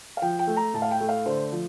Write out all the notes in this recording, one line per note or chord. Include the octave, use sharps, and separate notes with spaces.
F5
F3 G5
G5
A3
A#5
A2 A5
F5
G5
A3
F5
D3 C5
F3